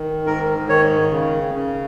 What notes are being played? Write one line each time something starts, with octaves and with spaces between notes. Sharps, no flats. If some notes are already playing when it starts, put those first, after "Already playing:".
Already playing: D#3
G#2 A#4
D#3 C#5
C#3
C#3